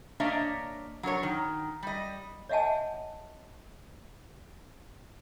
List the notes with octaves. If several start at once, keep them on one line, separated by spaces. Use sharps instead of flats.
A#3 D4 C#5 D#5 E5
F#3 D4 A#4 C#5
D#3
G3 D#5
C#5 D#5 E5 F#5 G#5 A5